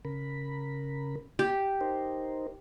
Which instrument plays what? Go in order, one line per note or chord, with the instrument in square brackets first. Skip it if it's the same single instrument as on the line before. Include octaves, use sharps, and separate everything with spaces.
[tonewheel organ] C#3 A#4 B5
[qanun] G4
[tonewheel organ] D#4 A#4 C5